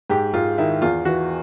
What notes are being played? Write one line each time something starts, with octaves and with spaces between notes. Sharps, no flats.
G#2 G4
G#2 F4
D#3 E4
E2 F4
E3 F#4